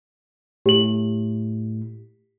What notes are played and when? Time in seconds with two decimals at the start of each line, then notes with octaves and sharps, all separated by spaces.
0.66 A2 G4 F#7